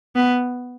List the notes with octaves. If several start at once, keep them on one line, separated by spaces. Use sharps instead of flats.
B3